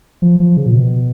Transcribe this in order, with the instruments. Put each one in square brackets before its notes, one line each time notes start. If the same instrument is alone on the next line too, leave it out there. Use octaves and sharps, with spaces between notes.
[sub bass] F3
F3
C#3
A#2
B2